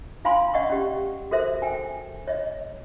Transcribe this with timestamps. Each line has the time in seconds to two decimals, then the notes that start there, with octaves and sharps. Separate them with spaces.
0.25 F4 F5 G#5 B5 C6
0.54 C#4 D5 D#5 F#5 C#6
0.70 C#4 G4
1.31 F#4 A4 A#4 C5 E5
1.62 G5 G#5
2.28 C#5 D#5